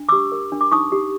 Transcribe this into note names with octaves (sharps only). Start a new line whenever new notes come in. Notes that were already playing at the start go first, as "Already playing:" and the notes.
Already playing: D4
G4 D6 E6
A#4
D4
D6
D#4 C#6 D#6
G4